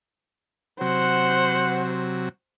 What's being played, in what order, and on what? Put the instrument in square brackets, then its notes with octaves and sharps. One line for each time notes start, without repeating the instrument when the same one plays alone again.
[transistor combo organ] C3 F#3 [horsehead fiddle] C5 [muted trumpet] F#5